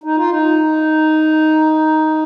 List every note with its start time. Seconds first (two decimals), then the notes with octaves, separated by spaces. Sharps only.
0.04 D#4
0.17 F4
0.29 D#4